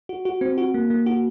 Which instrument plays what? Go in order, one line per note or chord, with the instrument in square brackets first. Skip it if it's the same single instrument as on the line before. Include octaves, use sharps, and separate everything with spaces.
[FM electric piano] F#4
F#4
C4
F#4
A#3
A#3
F#4